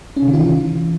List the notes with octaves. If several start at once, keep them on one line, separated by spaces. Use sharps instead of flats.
C#4
C3
D#3
F4
E3